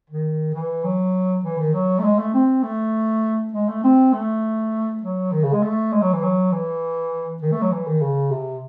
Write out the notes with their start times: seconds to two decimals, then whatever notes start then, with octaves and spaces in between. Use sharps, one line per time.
0.10 D#3
0.54 E3
0.84 F#3
1.44 E3
1.59 D#3
1.74 F#3
1.99 A3
2.04 G#3
2.19 A3
2.34 C4
2.63 A3
3.53 G#3
3.69 A3
3.84 C4
4.13 A3
5.03 F#3
5.33 D#3
5.43 C#3
5.53 G#3
5.63 A3
5.93 G#3
6.02 F#3
6.13 E3
6.23 F#3
6.52 E3
7.42 D#3
7.52 A3
7.62 F#3
7.72 E3
7.87 D#3
8.01 C#3
8.31 C3